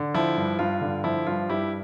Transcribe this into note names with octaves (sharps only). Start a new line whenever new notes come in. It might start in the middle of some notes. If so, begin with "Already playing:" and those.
Already playing: D3
F3 E4
G2
G2 F4
D3
F3 E4
G2 F4
G2 E4 G4